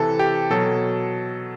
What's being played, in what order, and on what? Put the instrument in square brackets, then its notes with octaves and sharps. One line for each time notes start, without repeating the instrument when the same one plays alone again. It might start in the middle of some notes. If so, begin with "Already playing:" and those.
Already playing: [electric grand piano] C3 E3 A4
G4
B2 F#3 A4